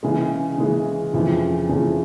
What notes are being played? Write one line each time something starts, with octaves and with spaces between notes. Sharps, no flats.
C#3 E3 G#3
C#3 E3 G#3
F2 C#3 E3
F2 C#3 E3